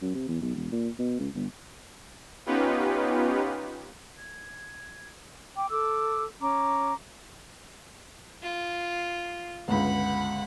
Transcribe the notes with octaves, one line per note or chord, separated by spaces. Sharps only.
F#2
C3
E2
B1
E1
A#2
B2
C#2
G1
B3 C#4 D#4 F4 G4 B4
G#6
G5 D6
A4 D6 E6
C#4 A#5 D6
F4
G1 C#2 F#5 B5